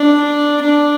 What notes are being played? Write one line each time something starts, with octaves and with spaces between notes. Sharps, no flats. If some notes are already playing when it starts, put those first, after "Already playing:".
Already playing: D4
D4